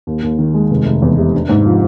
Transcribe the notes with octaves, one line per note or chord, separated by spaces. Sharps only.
D#2
D#2
D#3
G#3
F1
F1
E2
C3
D4
G#2
F3